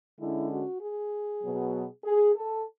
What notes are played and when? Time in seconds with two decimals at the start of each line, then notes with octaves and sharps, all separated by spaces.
0.19 D3 G#3 C#4 E4
0.50 F#4
0.81 G#4
1.43 B2 F#3 B3
2.04 G#4
2.35 A4